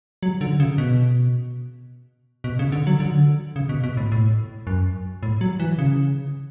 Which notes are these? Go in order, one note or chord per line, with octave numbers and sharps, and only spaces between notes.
F#3
D3
C#3
B2
B2
C#3
D3
F#3
D3
C#3
B2
B2
A2
A2
F#2
A2
F#3
E3
C#3